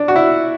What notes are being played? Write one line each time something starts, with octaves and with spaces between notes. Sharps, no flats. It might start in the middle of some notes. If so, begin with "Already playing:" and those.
Already playing: D4
F#4
E4